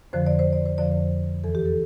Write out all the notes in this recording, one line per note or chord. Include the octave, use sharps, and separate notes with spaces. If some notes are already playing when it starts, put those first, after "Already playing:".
F2 D3 F3 C5
D5
C5
D5
C5
F2 D3 F3 D5
C5
E2 E3 A4
G4
A4